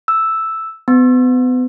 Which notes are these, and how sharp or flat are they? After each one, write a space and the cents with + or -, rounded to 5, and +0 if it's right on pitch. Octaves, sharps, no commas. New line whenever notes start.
E6 +0
B3 +35